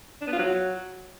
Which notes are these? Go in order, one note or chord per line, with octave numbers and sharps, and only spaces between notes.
D4
B3
F4
F#3